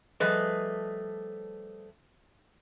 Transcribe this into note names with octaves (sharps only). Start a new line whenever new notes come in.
F3 G3 A3 G#4 B4 D#5